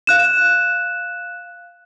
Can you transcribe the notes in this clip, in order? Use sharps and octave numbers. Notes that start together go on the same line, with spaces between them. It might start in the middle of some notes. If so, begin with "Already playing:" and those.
F5 F#6 E7